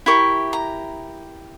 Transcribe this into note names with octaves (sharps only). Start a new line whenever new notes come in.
E4 G4 A#4 C#6
A#5